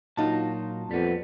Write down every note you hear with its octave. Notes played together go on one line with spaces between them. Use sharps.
A#2 F#3 A#3 D#4 F4 F#4 A5
F2 G3 B3